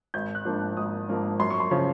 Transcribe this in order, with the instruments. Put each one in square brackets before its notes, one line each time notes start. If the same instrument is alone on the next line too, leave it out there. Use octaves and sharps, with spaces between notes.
[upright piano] G#1 G6
F#6
G#2 F3 A#3 D4
G#1 D#6
G#2 F3 A#3 D4
F#2 C6
C#6
C6
C#3 F3